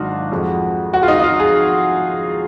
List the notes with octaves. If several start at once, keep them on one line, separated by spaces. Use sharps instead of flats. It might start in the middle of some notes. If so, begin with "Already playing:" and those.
Already playing: G#1 G#2 F#3 D4 D#4 F4 F#4
F2 F3 G#3
F#4
F4
D#4
D#4
F4
G#4